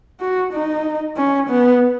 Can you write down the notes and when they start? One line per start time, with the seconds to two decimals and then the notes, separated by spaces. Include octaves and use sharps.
0.20 F#4
0.53 D#4
1.17 C#4
1.49 B3